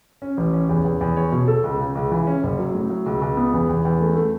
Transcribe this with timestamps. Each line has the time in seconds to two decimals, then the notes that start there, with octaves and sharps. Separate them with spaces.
0.22 C#4
0.37 A1
0.54 C#4
0.69 E2
0.85 E2
1.01 E2
1.17 C#5
1.32 B2
1.48 A4
1.64 C#2
1.80 C#3
1.95 C#2
2.11 E3
2.27 C#4
2.43 F#1
2.59 F#3
2.75 A2
2.90 F#3
3.06 C#2
3.21 C#2
3.37 B3
3.53 E2
3.69 E2
3.85 E2
4.00 A3
4.16 A3